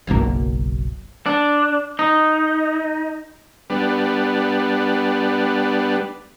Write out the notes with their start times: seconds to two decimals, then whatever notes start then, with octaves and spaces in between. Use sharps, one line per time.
0.07 F#1 B1 F#2 A#3
1.26 D4
1.99 D#4
3.70 G3 B3 D4